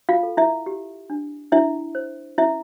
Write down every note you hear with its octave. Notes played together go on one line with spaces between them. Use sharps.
F4 F5
A4
E4 E5
G4
D4
D4 E4 E5
C5
C#4 E4 E5